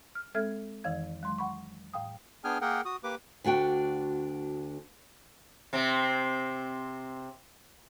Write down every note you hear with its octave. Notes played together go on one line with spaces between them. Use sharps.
F6
G#3 C4 A4 E5 F6 G#6
F2 D#3 E3 C#5 F5 G#6
F#3 G#3 C6
F#5 B5 C#6
A2 F5 G5 D#6
B3 D4 G#4 G5 G#5 F6
A#3 G#4 A#4 F#5 G5
F#4 D#6
A#3 G4 B4 D6
D2 D4 F#4 G5
C3 C4